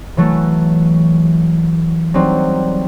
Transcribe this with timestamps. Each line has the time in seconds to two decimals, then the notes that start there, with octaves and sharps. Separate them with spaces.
0.17 E3 F#3 A3
2.14 F#3 G3 C4 D#4